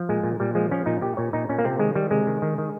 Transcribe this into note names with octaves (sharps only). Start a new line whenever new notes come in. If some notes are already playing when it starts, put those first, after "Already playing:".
Already playing: F3
A#2 G#3
A#2
A#2 G3
F3 G#3
F3 C#4
A#2 D#4
A#2 G4
A#2 C#5
A#2 D#4
A#2 C#4
A#3
C3 C4
D#3 G#3
D#3 G3
C3 G#3
D#3
D#3
D#3